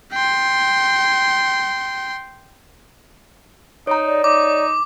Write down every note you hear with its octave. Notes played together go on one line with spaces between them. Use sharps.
G5 C6
D#4 C#5 A#5
D5
D#4 D6